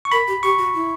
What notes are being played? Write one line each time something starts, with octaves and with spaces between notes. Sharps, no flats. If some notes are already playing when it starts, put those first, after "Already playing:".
C#6
A#4 B5
G4
G4 C#6
F#4
E4